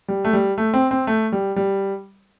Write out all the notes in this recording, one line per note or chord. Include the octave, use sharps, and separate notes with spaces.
G3
A3
G3
A3
C4
C4
A3
G3
G3